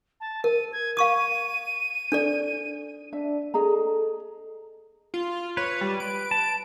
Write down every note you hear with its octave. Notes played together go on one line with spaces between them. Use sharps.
A5
A#4 D#7
G#6
F5 C#6 D#6 D#7
D4 A4 D5
D4 E5
G#4 A4 D#5 A#5
F4
B4 C#5
G3
D7
A5